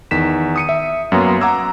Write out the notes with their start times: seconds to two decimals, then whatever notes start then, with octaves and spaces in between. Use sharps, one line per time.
0.11 E2 D#3 B6 E7
0.56 D#6 C#7 D#7
0.69 E5
1.12 F#2 F#3 A#3 B3 A#5 C6
1.41 F#5 A#5 D6 E6 G#6